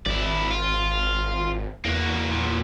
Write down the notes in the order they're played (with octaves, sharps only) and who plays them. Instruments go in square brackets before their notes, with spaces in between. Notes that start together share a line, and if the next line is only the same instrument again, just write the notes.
[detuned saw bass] G#1 [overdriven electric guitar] E4 D5
[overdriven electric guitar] F4
[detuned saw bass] E2 [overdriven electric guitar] A#3 F#4
[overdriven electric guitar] A#2 F#3